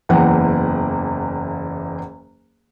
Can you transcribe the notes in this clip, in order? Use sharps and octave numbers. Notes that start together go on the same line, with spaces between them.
F#1 E2 E3 F#5 G5